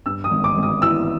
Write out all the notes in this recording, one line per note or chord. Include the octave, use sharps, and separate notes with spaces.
G2 E6
D#6
G#1
D6
G#1
D#6
E3 E6